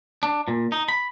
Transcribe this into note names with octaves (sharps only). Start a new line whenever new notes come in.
D4
A#2
D#4
B5